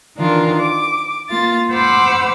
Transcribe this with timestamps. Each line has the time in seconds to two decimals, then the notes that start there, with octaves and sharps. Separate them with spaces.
0.17 D#3 E3 D4 F4 A#4
0.60 D6
1.29 A#3 F4 A6
1.72 C5 F#5 B5 D6 E6 F6